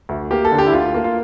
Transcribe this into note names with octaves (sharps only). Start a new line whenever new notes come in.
D2
A#3 G4
A4
D3
G4
E4
D2 F4
A#3
F4